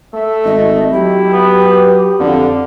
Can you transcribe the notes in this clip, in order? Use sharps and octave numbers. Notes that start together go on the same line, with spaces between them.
A3 E5
G#1 D#5
F#3 E4 G4
B3 B4
F2 D3 F5